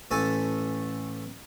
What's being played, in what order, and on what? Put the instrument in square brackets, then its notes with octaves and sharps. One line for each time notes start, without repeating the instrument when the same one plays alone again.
[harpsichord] A1 A3 A4 G#5 A5